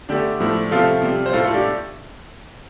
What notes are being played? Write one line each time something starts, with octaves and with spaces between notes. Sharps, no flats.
D3 A3 D4 G4
A2 F3 A3
C3 F3 A3 F4 A4
C3 G3
C5
A2 A3 F4 A4
F4 A4
D4 G4